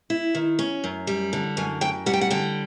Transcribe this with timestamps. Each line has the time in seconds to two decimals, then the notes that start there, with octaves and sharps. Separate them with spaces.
0.10 E4
0.35 D#3
0.59 C#4
0.84 F#2
1.07 G3
1.33 D3
1.57 F#2 G#5
1.81 F#2 G5
2.06 G3 F#5
2.13 G5
2.21 F#5
2.30 D3 G5